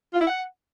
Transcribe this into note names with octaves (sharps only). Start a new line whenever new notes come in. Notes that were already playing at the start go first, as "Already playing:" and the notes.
F4
E4
F#5